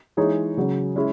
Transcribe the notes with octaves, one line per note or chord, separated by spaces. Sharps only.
E3 G#3 D#4 G#4 C#5
C#3 F#3 C#4
G#3 C#4 E4